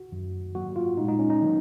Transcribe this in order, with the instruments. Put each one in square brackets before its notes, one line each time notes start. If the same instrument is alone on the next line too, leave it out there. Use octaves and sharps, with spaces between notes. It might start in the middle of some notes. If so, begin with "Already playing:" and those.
Already playing: [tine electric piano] F#4
F#2 D#3 F#3
G#2 F#3 A#3 F#4
F4
A#2 G#3 D#4
D#4
C#4
D#4
D#3 F#3 A#3